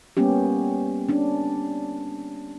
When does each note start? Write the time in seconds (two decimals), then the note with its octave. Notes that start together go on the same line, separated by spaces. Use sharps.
0.17 G3 A#3 B3 C#4 G4
1.09 C#4 D4